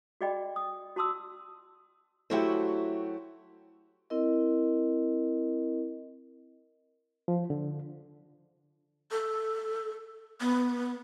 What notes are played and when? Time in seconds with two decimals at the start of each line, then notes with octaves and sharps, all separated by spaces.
0.21 F#4 G#4 D5 D#5 G5 B5
0.56 D#6
0.96 F#4 A5 C6 D#6 E6
2.30 F#3 A3 E4 F#4 G4 C5
4.10 C4 E4 A#4 D#5
7.28 F3
7.50 D3
9.11 A4
10.41 B3